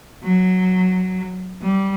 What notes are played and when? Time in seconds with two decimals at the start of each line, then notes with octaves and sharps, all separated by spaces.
0.24 F#3
1.62 G3